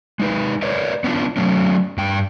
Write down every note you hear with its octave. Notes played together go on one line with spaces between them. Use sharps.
G#3 D#4 B4
A#4 B4 C#5 D5
B3 C#4 D4 F4
F#3 A3 C#4
G2 G5